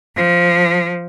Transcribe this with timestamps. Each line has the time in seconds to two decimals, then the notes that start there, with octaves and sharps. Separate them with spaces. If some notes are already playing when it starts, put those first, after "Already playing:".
0.16 F3